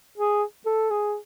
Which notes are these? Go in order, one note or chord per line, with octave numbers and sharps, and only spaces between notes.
G#4
A4
G#4